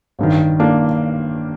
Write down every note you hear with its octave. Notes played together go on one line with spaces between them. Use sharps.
A1 G2 D#3
A#3 D4